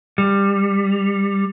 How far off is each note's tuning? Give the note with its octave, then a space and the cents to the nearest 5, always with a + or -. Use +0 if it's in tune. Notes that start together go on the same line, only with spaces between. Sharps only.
G3 +20